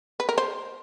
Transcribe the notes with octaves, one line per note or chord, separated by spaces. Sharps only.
B4
A#4
C5